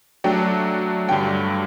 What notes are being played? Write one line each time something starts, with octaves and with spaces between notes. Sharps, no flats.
F#3 A3 D4 G5
G2 D3 F#3 G5